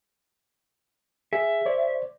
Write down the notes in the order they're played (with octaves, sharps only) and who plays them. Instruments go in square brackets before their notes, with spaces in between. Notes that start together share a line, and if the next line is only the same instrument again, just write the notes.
[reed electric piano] G#4 [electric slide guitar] E5
[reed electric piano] C5 D5